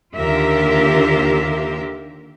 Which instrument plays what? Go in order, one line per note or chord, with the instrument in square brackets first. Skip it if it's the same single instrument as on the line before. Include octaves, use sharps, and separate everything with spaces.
[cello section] D#2 D3 F4 G4 A#4 E5